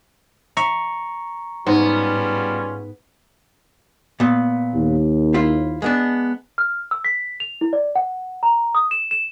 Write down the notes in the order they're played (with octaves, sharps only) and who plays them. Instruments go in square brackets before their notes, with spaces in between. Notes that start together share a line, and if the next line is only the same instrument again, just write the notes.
[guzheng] E5 [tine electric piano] A#5 C#6
[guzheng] G#2 [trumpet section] G3 C#4 F4 [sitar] B3
[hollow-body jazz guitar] A#2 B3
[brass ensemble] D#2
[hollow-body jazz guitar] E4 F4 C5
G#3 B3 D4
[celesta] F6
E6
B6
F7
E4
D5
F#5
A#5
D#6
E7
E7